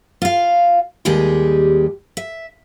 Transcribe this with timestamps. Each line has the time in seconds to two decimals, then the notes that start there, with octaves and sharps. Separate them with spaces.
0.22 F4 F5
1.05 D#2 G3 G#3 G4 G#4
2.17 E5